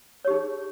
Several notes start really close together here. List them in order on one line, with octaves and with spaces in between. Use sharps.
C#5 G4 D#4 G#4